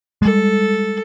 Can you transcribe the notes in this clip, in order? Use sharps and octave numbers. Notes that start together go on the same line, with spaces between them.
G3 G#3 A4